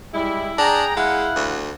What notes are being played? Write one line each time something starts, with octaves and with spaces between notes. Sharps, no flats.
G3 G#3 E4
D4 G#4 G5 A#5
G#3 E4 F5 F#5
D2